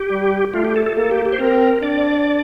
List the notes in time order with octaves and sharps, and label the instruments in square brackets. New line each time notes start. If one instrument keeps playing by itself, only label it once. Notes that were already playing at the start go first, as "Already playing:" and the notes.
Already playing: [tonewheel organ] G4
[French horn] G3
[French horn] A3 [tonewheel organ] F4
[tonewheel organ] G4
A4
A4
[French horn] A#3 [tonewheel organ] A4
[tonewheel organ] G4
G4
C5
[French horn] C4 [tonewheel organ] A#4
[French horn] D4 [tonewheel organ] D5